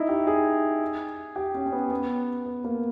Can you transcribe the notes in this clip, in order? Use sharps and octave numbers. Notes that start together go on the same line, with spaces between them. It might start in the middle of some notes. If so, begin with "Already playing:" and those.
Already playing: D#4 E4
G4
G#4
G4
C#4
C#4
B3
B3
B3
A#3